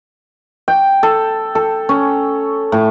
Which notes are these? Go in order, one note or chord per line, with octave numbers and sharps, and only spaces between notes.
G5
A4
A4
C#4
A2